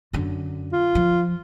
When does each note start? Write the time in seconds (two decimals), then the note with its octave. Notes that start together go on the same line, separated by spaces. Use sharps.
0.13 F#2 D3
0.73 F4
0.95 F3